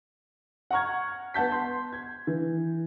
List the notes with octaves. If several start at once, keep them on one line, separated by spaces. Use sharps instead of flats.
F#5 A#5 C#6 F6 G#6
B3 F#5 A5 G6 B6
C6
G#6
E3